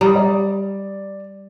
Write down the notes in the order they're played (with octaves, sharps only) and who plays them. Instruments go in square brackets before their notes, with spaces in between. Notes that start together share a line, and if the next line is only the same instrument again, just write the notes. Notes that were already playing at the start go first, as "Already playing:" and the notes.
[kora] G3 [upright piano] A#5 D#6
[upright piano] D5